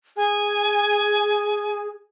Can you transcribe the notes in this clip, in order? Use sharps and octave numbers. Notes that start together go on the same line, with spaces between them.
G#4 G#5